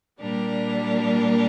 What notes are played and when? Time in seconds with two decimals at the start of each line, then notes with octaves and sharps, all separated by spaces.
0.20 A#2 G3 A#3 D4 A#4